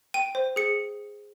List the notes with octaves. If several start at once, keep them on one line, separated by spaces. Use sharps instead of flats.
G5 D#7
C5
G#4 C#7